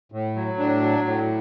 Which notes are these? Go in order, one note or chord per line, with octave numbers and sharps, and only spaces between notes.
A2
F#3
A2 D4
F#3
A2